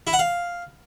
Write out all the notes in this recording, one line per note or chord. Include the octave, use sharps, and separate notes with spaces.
E4
F#5
F5